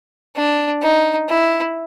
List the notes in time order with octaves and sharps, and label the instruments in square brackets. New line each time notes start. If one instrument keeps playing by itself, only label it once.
[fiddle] D4
D#4
E4